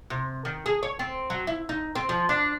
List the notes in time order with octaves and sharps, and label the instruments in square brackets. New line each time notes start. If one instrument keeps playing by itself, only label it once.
[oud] C3
D#3
G#4
C#5
C4
F#3
E4
D#4
C4
F3
D4